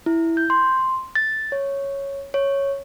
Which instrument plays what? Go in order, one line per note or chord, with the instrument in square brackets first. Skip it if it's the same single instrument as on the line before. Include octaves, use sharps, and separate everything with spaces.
[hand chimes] E4
G6
C6
A6
C#5
C#5